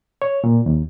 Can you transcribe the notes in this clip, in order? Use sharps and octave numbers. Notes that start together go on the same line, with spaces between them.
C#5
A#2
D#2